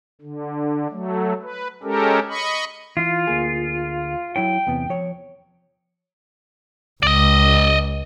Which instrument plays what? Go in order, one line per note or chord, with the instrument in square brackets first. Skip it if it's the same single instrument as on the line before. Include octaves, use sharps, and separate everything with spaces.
[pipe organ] D3
F#3 A3
B4
G#3 C#4 G4 A4 A#4
D#5 B5 C#6
[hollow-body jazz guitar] E3 [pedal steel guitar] F4
[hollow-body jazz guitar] D2 A#3 G#4
[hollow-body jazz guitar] F#3 E4 C#5 [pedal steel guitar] G5
[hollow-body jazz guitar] E2 C3 B3
F3 C#5
[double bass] C#2 [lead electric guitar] D5 D#5